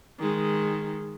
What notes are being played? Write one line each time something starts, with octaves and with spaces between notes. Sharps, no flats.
D#3 G#3